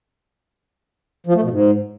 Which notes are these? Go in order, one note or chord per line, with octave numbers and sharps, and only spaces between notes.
F3
A3
B2
G#2